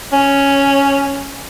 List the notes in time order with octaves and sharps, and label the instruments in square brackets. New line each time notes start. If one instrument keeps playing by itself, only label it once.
[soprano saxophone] C#4